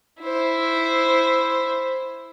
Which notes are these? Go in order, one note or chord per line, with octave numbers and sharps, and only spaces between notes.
E4 C5